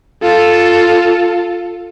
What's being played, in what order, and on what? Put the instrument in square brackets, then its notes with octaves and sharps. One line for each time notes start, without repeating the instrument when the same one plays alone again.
[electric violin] F4 A4